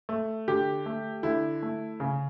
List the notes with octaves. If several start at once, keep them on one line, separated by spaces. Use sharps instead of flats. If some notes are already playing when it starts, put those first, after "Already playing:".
A3
D3 G4
A3
D3 E4
A3
C#3